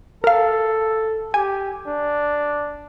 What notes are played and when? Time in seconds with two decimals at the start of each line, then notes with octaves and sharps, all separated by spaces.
0.24 A4 A#4 F5
1.34 G4 G#5
1.87 D4